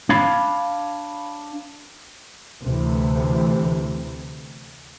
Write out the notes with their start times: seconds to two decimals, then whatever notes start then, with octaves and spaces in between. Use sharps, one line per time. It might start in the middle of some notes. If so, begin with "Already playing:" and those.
0.09 D4 C#5 F5 B5
2.62 D2 C3 E3